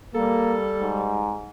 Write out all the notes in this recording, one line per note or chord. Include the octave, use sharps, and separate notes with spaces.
G3 A#3 A4
G#2